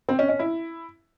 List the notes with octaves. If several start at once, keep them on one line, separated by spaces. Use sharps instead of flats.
C4
C#4
C#4
E4